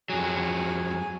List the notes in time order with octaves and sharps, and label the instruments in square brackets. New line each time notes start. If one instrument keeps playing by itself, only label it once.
[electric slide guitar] F2 F#3 [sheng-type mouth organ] G#4 G#5